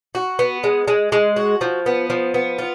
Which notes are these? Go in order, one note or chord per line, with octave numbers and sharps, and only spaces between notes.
F#4
B3
G#3
G#3
G#3
F#4
F3
B3
F3
B3
F4